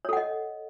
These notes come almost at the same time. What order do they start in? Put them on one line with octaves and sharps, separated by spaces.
C#5 A4 F#5 D#5